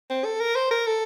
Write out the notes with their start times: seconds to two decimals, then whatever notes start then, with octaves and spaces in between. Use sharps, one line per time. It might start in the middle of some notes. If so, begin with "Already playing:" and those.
0.10 C4
0.25 A4
0.40 A#4
0.55 C5
0.71 A#4
0.86 A4